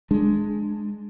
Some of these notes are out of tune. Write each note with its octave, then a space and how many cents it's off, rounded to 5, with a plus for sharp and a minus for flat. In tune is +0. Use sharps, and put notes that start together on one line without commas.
G#3 +10 D4 +15